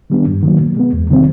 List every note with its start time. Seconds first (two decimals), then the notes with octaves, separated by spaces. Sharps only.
0.10 D#3 G3 B3 D4
0.27 G2
0.43 D#3 F#3 A#3
0.60 B2
0.77 G#3 B3
0.93 E2
1.09 C3 D#3 G3 C4